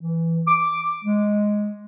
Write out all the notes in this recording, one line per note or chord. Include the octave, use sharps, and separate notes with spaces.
E3
D6
G#3